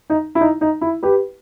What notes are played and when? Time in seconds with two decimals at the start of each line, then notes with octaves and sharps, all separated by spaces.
0.10 D#4
0.35 E4
0.41 D#4
0.61 D#4
0.81 E4
1.03 G4 B4